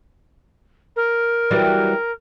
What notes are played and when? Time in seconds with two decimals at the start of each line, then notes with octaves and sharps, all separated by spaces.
0.96 A#4
1.51 E3 F#3 G3